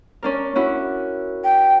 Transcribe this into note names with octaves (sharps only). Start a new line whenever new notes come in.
C#4 D4 A#4
C#4 E4 F#4
G5